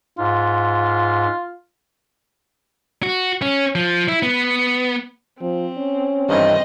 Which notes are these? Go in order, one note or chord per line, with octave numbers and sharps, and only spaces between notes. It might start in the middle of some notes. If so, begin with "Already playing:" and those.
G#2 F4
F#4
C#4
F3
E4
B3
F3 C4
C#4
G2 D#3 E3 C4 D#5